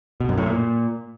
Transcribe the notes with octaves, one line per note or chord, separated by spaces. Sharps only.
B2
F#2
A2
A#2